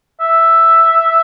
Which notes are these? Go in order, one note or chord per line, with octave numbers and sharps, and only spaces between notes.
E5